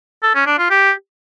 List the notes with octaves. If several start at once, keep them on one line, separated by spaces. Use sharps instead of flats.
A4
C#4
D4
F4
G4